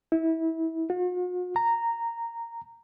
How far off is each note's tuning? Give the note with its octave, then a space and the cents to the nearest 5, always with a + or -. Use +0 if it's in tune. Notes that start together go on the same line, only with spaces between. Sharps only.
E4 -25
F#4 -45
A#5 -10